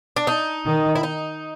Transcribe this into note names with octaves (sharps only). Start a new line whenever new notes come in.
D4
D#4
D#3
E4
D#4